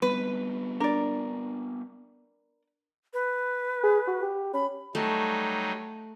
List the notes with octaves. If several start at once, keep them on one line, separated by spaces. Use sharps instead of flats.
G3 B3 C4 B4
D4 A#4 D5
B4
G#4
F#4
G4
C#4 B5
F#3 G3 A3 D#4